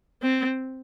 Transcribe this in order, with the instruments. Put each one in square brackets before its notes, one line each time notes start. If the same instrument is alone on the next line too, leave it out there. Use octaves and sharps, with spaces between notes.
[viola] C4